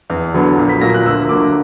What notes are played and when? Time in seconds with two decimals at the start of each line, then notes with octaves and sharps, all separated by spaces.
0.10 E2
0.34 D3 F#3 B3
0.58 A#1
0.69 B6
0.81 A#2 F#3 A#3 A#6
0.94 F#6
1.05 D2 E6
1.29 D3 F#3 A#3 D6